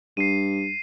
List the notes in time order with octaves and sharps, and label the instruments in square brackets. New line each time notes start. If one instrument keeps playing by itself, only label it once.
[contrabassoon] G2 [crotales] C7 D#7